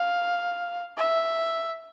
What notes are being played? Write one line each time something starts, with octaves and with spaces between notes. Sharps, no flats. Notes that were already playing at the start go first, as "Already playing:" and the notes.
Already playing: F5
E5